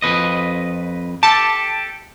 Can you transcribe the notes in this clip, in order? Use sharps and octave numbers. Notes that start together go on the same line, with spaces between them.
F2 B4 D#5
G4 A4 A5